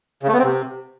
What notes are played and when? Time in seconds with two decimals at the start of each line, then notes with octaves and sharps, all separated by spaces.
0.23 C#3
0.28 A3
0.33 B3
0.39 C4
0.44 C3